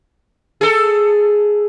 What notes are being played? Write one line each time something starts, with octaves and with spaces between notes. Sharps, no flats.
G#4 A4